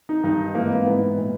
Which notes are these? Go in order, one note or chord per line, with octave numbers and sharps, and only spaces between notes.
D#4
G2 D#3 D#4
G#2 E3 A#3
B3
G#2 E3 B3
A#2